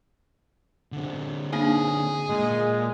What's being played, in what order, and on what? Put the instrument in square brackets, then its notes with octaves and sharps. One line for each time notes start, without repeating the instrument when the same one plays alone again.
[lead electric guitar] D3 C4
[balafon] A#3 D4 D#4 [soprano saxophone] G#4
[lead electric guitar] A#2 [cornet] G#3